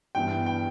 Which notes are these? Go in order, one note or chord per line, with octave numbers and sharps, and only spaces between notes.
G2 E3 B3 G5
G5